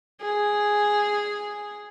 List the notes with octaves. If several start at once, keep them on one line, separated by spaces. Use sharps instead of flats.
G#4